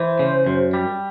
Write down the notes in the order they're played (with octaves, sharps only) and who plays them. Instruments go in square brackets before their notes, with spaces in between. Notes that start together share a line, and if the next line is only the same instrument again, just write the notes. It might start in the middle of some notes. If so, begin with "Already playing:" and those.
Already playing: [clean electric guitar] E3 [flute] C5
[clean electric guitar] C#3
F#2
G3